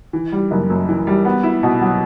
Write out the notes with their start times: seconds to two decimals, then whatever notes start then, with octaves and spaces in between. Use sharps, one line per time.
0.13 E3
0.32 G3
0.51 F#1
0.70 F#2
0.89 E3
1.07 G3
1.25 B3
1.43 E4
1.63 B2
1.81 F#3